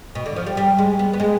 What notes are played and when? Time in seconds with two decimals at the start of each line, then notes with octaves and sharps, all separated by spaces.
0.15 B2
0.26 D3
0.36 F3
0.46 G3
0.57 G3
0.78 G#3
0.99 B3
1.13 B3
1.20 G#3